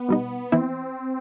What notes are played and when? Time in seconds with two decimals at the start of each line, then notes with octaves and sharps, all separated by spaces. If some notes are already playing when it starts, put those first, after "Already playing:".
Already playing: B3
0.09 B2 G3 D#4
0.52 E3 B3 C4 E4